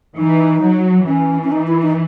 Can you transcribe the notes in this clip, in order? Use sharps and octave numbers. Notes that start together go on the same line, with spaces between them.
E3 D#4
F#3
E3 C#4
C#4
D#4
E4
D#4